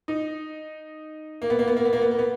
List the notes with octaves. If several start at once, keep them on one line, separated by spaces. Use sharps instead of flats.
D#4
A#3
B3
A#3
B3
A#3
B3
A#3
B3
A#3
B3